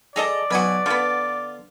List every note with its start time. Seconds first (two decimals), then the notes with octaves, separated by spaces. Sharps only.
0.16 G#4 A4 D5 D#5 A#5
0.51 B1 F#4 B4 G#5 D#6
0.86 D3 B3 F4